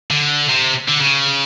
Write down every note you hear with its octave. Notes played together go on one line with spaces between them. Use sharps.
D3
C3
D3
C#3